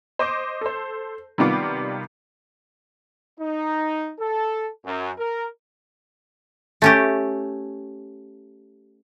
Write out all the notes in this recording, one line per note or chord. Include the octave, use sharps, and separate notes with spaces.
C5 D#5 D6 G6
A4 C5
C3 D#3 G3 B3 F4 D6
D#4
A4
F#2
A#4
A3 C#4 G4